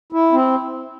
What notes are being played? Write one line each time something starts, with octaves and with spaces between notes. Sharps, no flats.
E4
C4